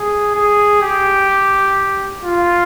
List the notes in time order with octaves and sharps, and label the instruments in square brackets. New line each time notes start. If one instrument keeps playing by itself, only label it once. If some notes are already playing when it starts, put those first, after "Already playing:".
Already playing: [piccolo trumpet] G#4
G#4
G4
F4